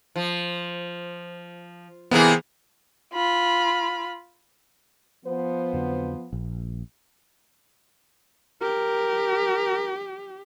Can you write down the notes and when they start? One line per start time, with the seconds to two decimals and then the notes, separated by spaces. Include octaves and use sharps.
0.16 F3
2.11 C3 E3 A#3 B3 G#4
3.14 F4 B5
5.25 F3 B3 C5
5.73 F2 D3 F#3
6.33 A#1
8.62 G4 A#4